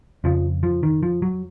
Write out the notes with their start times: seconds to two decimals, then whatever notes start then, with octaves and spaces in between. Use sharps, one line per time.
0.24 F2 C#3 F3
0.63 F3
0.83 D#3
1.03 F3
1.22 F#3